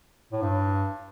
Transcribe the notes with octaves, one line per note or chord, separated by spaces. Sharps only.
A2
G2